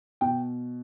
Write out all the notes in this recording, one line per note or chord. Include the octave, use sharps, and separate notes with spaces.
B2 G5